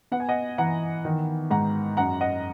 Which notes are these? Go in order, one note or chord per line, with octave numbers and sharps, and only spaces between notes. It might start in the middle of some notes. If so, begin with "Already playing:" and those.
B3 F#5
G#5
D#5 F#5
E3 F#5 A#5
D#3
G#2 F#5 A#5
F#2 F#5 A#5
D#5 F#5